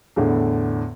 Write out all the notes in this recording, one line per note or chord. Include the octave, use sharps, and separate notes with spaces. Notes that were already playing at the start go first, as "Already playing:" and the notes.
E2 A2 D3